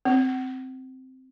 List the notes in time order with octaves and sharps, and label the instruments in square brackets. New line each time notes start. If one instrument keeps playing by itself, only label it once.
[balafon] C4